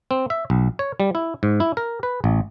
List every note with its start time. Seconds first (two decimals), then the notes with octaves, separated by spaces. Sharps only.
0.11 C4
0.30 E5
0.50 B1
0.79 C#5
1.00 G3
1.15 E4
1.43 G#2
1.60 E4
1.77 A#4
2.03 B4
2.24 A1